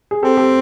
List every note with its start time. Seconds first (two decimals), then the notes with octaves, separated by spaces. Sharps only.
0.11 G#4
0.23 C4 G4 A4
0.37 G4 A4